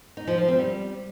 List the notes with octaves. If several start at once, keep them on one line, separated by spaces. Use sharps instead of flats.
D#4
F3
F3
C4
G3